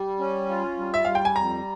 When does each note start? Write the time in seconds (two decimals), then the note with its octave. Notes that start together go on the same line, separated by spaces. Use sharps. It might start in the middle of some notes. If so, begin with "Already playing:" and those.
Already playing: G3
0.19 C#4
0.49 F4
0.78 G3
0.94 E5
1.05 G3 F5
1.15 G5
1.25 G#5
1.36 F2 A#5